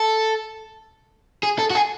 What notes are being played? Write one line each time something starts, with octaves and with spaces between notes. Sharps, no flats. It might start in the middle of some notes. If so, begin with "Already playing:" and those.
Already playing: A4
G#4
A4
F#4
G#4